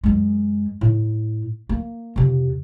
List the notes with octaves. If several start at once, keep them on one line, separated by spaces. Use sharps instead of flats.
F#2 G#3
A2
A#3
F2 C3